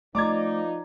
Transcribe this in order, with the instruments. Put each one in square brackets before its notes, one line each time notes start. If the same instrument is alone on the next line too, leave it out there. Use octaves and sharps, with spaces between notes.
[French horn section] F3 D#4 [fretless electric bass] A3 [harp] D5 A#5 [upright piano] D6 G#6